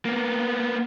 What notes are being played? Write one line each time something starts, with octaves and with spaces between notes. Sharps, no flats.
A#3 B3